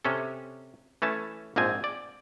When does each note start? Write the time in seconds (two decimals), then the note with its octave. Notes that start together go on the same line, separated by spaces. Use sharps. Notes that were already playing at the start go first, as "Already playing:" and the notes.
0.05 C3 C#4 A4
1.02 E3 A3 C#4 A5
1.56 A#1 G#2 F3 C4 G#5
1.84 D5